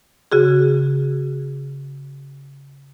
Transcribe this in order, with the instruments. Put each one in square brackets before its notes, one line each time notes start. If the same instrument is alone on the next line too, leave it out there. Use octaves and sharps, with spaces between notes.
[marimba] C#3 F#4 G#4